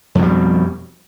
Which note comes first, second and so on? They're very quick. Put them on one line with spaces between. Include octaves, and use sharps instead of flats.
F2 B2 G3